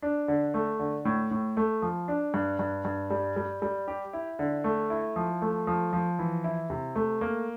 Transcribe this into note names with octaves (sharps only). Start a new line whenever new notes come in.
D4
D3
A3
D3
A2
A2
A3
F3
D4
G2
G2
G2
G3
G3
G3
G4
E4
D3
A3
E4
F3
A3
F3
F3
E3
E4
C3
A3
A#3